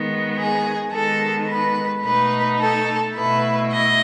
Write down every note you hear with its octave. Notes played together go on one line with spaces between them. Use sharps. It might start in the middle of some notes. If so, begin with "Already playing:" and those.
Already playing: D#3 G#3 B3
G#4
D#3 G#3 B3 A4
B4
B2 A3 D#4 B4
A4
B2 A3 E4 B4
D#5